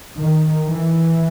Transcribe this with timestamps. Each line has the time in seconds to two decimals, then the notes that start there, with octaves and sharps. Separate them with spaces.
0.19 D#3
0.68 E3